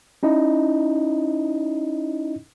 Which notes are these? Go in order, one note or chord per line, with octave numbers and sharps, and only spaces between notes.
C#4 D#4 E4 D#5